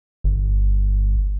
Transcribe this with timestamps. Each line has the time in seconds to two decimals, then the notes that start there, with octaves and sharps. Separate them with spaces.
0.24 G1